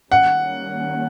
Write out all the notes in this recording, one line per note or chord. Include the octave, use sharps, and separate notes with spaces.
D#3 G3 A#3 C#4 F#5